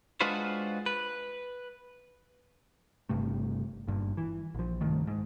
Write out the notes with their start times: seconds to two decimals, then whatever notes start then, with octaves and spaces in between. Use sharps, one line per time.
0.21 G#3 D4 F4 F#4 B4 C5
0.86 B4
3.09 G1 G2 C3 A3
3.87 G1 G2 A#2
4.17 E3
4.55 A#1 F3
4.81 C2 G2 D#3 A3
5.07 G#2